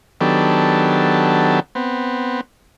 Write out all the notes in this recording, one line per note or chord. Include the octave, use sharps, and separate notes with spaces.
D#3 F#3 B3 D4 G4 A4
B3 C4